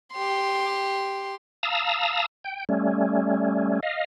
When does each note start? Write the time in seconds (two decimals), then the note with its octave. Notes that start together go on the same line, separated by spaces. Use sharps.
0.12 G4 C6
1.63 F5 A5 A#5 D#6 E6
2.44 G5
2.69 G3 A3 C#4
3.83 D#5 F5